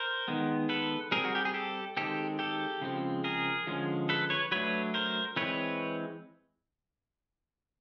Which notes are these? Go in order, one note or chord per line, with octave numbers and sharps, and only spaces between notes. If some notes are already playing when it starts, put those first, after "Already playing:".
Already playing: A#4 C5
D#3 G#3 B3
A4 B4
G3 C4 G#4 A#4
F#4
G4
G#4
G4 A4
D#3 G#3 C4 G4 A4
G4 A4
C#3 F3 G#3 C4
G#4 A#4
D3 F3 G#3 C#4
A4 B4
B4 C#5
F#3 A3 D4 B4 C#5
A#4 C5
E3 G#3 C4 B4 C#5